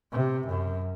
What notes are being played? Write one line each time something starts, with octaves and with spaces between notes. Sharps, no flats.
C3
F#2